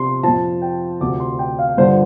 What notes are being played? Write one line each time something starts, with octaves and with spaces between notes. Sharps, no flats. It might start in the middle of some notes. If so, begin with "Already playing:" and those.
Already playing: C3 F3 C6
F2 F3 A5
G5
D2 C3 F3 D6
C6
G5
F5
G2 D3 F3 C5